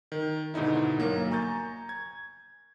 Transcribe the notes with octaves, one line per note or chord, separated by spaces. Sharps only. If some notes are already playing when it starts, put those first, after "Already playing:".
D#3
G#2 B2 D3 D#4 E4
G1 F#3 A#3
G#5 A#5 C#6 G6 A6
G#6